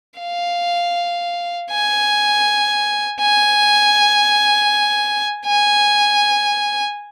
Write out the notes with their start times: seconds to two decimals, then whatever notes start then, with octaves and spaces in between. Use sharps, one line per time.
0.20 F5
1.71 G#5
3.21 G#5
5.47 G#5